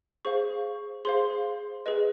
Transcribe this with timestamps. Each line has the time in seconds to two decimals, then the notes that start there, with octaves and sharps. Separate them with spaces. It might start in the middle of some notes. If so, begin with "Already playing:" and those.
0.25 G#4 C5 F5 C#6
1.05 G#4 C5 F5 C6
1.86 G#4 B4 D#5